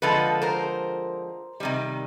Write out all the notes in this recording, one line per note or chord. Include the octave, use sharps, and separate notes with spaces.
D3 F3 G#3 A4 B4
A#4 C5
C3 D#3 G3